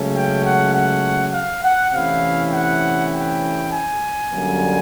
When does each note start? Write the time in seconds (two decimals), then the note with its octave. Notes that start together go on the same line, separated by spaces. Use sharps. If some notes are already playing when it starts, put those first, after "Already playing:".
Already playing: C#2 C#3 F#3 A3 C#4
0.14 G5
0.44 F#5
0.74 F#5
1.33 F5
1.63 F#5
1.93 C3 E3 A3 C#4 E4 F5
2.53 F#5
3.13 G5
3.72 G#5
4.31 F#2 D3 G3 A#3